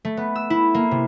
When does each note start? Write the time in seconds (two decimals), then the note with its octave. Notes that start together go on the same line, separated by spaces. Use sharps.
0.05 A3
0.17 B3
0.36 E6
0.50 E4
0.74 A#3
0.91 C3